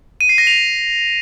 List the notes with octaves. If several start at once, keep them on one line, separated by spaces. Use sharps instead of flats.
D#7
C7
A#6
F7